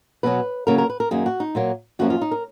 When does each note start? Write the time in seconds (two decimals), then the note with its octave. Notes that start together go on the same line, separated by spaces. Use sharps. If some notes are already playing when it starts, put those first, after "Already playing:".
0.23 B2 F#3 B3 B4
0.67 C#3 F#3 A#3 A#4
0.78 A#4
0.90 B4
1.00 A#4
1.11 F#2 D#3 A#3 G#4
1.26 F#4
1.40 D#4
1.55 A#2 F#3 A#3
1.99 F#2 F3 A#3 C#4 F#4
2.10 F4
2.21 D#4
2.31 A#4